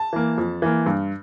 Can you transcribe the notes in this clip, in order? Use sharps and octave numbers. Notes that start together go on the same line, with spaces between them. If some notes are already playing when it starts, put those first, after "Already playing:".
Already playing: A5
E3 A#3
F2
E3 A#3
G2